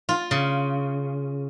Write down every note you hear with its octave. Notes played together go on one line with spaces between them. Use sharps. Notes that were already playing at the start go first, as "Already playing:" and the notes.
F4
C#3